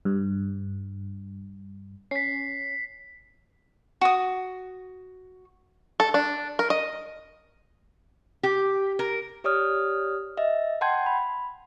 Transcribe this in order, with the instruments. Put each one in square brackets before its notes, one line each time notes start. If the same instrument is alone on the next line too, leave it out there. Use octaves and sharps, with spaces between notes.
[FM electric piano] G2
[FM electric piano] C#4 [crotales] B6 C7
[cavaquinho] F#4 D#6
[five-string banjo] A4
D4
A#4
D#5
[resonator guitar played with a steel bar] G4
A#4
[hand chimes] G4 C#5 D5 D#6 F6
D#5 E5
F#5 G5 A5 C6 G6 G#6
B5